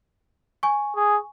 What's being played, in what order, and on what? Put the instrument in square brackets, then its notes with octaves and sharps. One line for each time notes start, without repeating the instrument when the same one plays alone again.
[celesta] G#5 C#6
[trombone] G#4